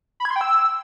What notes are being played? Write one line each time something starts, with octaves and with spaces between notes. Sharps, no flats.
B5
G#6
C6
G5
E6